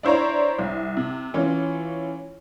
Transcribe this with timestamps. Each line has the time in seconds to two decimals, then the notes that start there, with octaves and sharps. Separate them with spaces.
0.03 D4 E4 C5 C#5 A#5
0.59 C2
0.97 C3
1.34 E3 C#4 F4